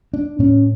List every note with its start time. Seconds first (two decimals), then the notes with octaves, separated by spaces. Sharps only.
0.14 D4
0.39 A2 C#4